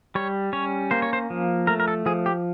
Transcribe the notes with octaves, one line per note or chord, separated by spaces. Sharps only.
G3 C#5
C#4 C#5
A#3 C5
C#5
C5
F3
A3 A#4
A#4
A4
F3 G#4
G4